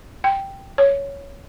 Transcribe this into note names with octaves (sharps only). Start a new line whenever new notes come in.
G5
C#5